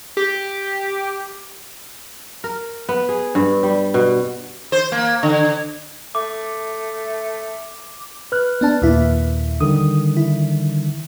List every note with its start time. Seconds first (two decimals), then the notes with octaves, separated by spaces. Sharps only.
0.17 G4
2.44 A#4
2.89 B3
3.09 G#4
3.35 G2
3.63 G3
3.94 B2
4.72 C5
4.92 A#3
5.23 D3
6.15 A3 D6
8.32 B4 F6 F#6
8.61 B3 D4 A5
8.82 D#2 A#2 E4
9.60 D3 D#3 G3 D#6
10.17 E4